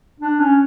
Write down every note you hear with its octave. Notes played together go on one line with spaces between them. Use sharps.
D4
C#4